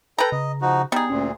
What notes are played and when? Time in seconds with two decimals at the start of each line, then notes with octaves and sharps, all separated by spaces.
0.18 A4 B4 G5 A#5
0.32 C#3 D#5
0.62 F3 D#4 F#4
0.92 G3 B3 D#4 G#4
1.10 D2 A#2 C#4